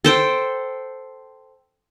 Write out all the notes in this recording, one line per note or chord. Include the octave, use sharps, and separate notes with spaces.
A4 C5 G5